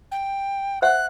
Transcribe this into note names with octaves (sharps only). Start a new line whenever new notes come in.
G5
C5 E5 F#5 F#6